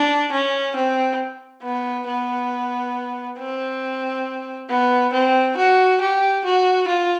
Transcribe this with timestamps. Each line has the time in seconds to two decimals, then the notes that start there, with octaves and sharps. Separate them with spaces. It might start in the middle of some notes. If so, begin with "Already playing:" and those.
Already playing: D4
0.32 C#4
0.76 C4
1.63 B3
2.07 B3
3.39 C4
4.70 B3
5.13 C4
5.57 F#4
6.01 G4
6.45 F#4
6.88 F4